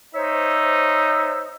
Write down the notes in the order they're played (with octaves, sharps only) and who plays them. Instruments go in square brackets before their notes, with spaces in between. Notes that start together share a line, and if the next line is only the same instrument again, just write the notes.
[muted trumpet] D#4 [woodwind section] C5 C#5 E5